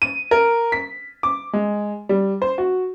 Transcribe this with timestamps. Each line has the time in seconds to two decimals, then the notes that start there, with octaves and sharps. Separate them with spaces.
0.02 D#7
0.31 A#4
0.72 B6
1.23 D6
1.53 G#3
2.09 G3
2.42 C5
2.58 F#4